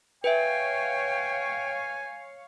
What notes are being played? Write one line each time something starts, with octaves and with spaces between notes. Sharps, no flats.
B4 C#5 E5 F5 G5 G#5